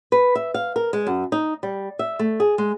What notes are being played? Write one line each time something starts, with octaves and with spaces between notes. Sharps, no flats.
B4
E5
F5
A#4
G#3
F#2
D#4
G3
E5
A3
G#4
G#3